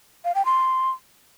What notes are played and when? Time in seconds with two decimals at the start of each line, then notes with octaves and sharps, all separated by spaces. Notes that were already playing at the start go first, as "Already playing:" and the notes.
0.25 F5
0.35 G5
0.45 C6